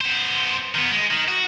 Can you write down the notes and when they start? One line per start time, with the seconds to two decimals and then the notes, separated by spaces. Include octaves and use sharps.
0.01 B3 C5
0.75 D#3 B3
0.92 G#3
1.11 D#3
1.28 F#4